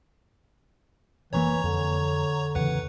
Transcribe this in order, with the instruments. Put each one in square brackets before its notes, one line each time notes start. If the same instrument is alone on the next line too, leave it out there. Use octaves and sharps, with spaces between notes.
[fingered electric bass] F1 A#2 A#3 [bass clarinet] E3 [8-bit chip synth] C#5 A#5 C#6
[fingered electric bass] F2 [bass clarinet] D3
[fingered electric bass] E2 C#3 E3 [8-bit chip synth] B4 F#5